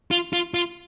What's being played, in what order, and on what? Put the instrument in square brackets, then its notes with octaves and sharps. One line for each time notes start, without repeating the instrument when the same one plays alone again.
[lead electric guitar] F4
F4
F4